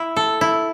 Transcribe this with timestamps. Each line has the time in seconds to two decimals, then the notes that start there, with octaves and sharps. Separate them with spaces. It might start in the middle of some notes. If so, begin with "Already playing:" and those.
Already playing: E4
0.17 A4
0.41 E4